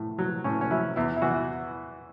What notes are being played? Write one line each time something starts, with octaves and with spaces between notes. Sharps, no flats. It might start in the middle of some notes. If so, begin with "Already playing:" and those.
Already playing: A2
F#3
A2 C#4
C#4
F#3 E4
E2 E4
E4
E3 F#4